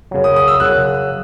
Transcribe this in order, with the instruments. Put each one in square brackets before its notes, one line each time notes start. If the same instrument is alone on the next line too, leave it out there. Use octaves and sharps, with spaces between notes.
[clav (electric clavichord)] F#2 C#3 F#3
[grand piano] D#6
D#6
E6
[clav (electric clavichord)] F#2 C#3 F#3 [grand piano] F#6